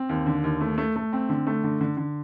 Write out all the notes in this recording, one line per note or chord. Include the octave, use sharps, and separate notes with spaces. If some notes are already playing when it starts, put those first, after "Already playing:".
Already playing: C4
D#2
D3
D#2
A3
A3
A3
C4
D3
A3
D3
D3
D3